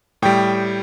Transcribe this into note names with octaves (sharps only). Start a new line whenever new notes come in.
A2 G3 G5